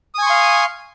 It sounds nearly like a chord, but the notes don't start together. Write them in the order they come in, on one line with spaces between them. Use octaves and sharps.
D#6 G#5 C#6 C6 F5